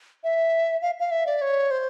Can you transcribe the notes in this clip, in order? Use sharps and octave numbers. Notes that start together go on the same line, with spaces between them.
E5
F5
F5
E5
D5
C#5
C5